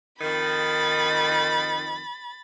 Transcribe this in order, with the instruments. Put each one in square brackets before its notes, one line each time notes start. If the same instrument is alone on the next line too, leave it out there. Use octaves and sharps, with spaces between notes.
[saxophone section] F2 D#3 [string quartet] B5 A6